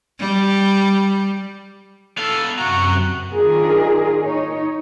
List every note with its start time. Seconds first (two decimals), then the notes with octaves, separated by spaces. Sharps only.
0.19 G3
2.18 B3 A4 F5
2.59 F#2 C3 F#4 F#5 A#5
3.33 D#3 D4 F4 G#4 A#4
4.21 D#4 C#5